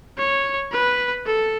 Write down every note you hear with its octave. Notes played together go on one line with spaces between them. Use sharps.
C#5
B4
A4